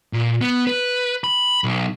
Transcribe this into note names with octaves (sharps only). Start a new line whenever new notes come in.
A#2
B3
B4
B5
B1